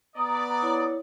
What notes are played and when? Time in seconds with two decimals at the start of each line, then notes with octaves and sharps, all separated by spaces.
0.16 B3 D5 A#5 D#6
0.63 E4 C#5